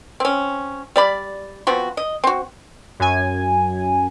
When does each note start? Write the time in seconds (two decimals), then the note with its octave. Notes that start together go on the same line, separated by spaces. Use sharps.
0.20 C4 C#4
0.96 G3 D5 B5
1.67 F3 B3 C4 F#4
1.97 D#5
2.24 C4 F#4
3.00 F#2 G#5